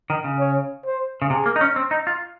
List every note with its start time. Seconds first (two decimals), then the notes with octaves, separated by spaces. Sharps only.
0.10 D#3
0.24 C#3
0.39 C#5
0.85 C5
1.22 C#3
1.30 C3 G#4
1.46 A#3
1.56 D#4
1.61 C#4
1.76 C4
1.91 D#4
2.07 F4